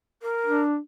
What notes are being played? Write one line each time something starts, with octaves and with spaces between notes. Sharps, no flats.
A#4
D4